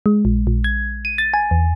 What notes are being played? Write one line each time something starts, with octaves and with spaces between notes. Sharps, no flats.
G#3
A#1
A#1
G#6
D#7
A6
G#5
E2